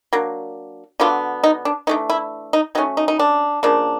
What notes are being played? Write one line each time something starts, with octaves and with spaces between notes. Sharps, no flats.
F#3 A#3 D4
D3 F#3 B3 D4 F4
D#4
D4
E3 A3 D4 D#4
E4
D#4
F#3 A3 C#4 D#4
D#4
D#4
D4
C#3 F3 A#3 D4